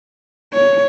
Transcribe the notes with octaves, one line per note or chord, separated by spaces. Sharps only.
C#5